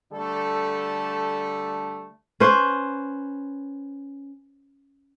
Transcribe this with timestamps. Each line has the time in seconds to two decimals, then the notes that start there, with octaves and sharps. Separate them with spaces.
0.13 D3 G3 A3 A4
2.40 C#4 B4 C5